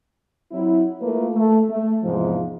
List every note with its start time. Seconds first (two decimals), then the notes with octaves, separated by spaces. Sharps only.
0.52 F#3 C4 E4
1.02 A3 A#3 E4 F4 A#4 B4
1.35 A3
1.69 A3
2.04 E2 G#2 C3 F3